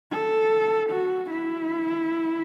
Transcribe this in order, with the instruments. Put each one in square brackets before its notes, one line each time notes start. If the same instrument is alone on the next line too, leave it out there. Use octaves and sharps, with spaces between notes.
[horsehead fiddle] A4
F#4
E4